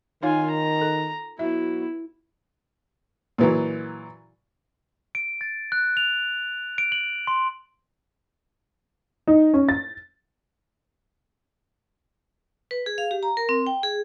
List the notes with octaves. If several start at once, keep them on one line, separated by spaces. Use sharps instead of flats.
D#3 D#4 F4 C#5 F5 G#5
A#5
A4
F#3 B3 E4 F#4 E5
A#2 E3 F#3
D7
A6
F#6
F7
D7
F#7
C6
D#4
C#4
A6
B4
G#4
F5
G4
A#5
A#4
C4
G5
G#4